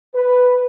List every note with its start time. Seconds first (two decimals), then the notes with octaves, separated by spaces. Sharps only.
0.14 B4